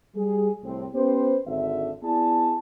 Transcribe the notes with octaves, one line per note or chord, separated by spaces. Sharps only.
G3 G#4
C2 A2 C4
B3 C#4 G4 B4 C5
G#1 D3 E5
B3 E4 G#4 D5 A5